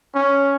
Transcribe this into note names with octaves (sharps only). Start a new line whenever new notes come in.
C#4